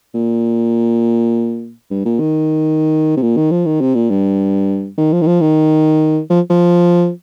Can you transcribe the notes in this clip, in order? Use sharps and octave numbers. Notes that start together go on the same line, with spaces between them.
A#2
G2
A#2
D#3
C3
A#2
D#3
F3
D#3
C3
A#2
G2
D#3
F3
D#3
F3
D#3
F3
F3